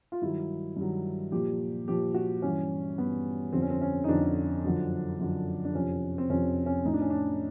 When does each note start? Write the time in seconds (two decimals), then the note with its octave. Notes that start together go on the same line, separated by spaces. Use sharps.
0.12 F4
0.21 G2 D#3 F#3 E4
0.76 G2 D#3 F#3
1.32 A#2 F3 G4
1.87 A#2 F3 G4
2.14 F#4
2.42 G2 E3 C#4
2.98 G2 E3 B3
3.53 F2 D3 F3 C4
3.62 C#4
3.70 C4
3.81 C#4
4.04 D#4
4.08 F2 D3 F3 D4
4.64 F#2 D3 F3
5.19 F#2 D3 F3
5.65 D4
5.75 F2 C3 F3 C#4
6.18 C4
6.29 F2 C3 F3 C#4
6.66 C#4
6.85 A2 F3 D#4
6.94 D4
7.01 C#4
7.10 D4